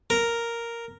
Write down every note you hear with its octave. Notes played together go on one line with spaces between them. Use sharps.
A#4